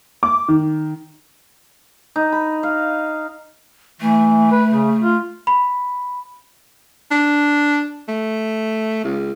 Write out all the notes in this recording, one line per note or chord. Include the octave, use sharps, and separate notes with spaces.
D6
D#3
D#4
B5
F5
E3 A3
B4
C#3
F4
B5
D4
A3
C#2